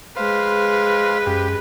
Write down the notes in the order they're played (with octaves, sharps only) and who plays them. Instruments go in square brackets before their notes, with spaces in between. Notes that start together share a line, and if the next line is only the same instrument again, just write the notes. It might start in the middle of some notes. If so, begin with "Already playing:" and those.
[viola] G#3 B4 [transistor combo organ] C5 F5
[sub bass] F#2 [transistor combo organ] G4